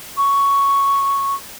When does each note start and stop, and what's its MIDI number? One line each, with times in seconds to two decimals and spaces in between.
0.17 1.35 85